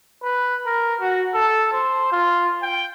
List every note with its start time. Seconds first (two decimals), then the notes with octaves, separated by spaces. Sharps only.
0.23 B4
0.66 A#4
1.00 F#4
1.34 A4
1.72 C5
2.12 F4
2.62 G5